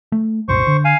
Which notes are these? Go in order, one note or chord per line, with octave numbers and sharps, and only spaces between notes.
A3
C2 F#2 A#2 C5 C#6
D3
F5 G#5